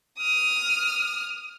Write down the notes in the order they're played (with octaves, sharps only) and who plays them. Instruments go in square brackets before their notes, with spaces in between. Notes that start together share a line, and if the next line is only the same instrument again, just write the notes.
[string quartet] D#6 F6